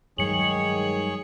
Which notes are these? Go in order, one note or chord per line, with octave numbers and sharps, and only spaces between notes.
G2 D#3 F#3 G#3 G#4 C#5 C#7 F#7